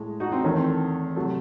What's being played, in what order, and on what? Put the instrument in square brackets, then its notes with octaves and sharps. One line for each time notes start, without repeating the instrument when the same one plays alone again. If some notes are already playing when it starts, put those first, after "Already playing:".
Already playing: [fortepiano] A2 G#3
D#4 F#4
C4 D#4
E2 D#3 A3 C#4
C4
A3
C3 F#3 A3